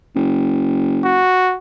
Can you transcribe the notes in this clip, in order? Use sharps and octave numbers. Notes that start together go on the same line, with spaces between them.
F#1
F#4